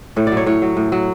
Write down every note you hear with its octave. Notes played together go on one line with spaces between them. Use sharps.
A2 C#5
D5
F#3 C#5
A2 C#5
F#3
A2
F#3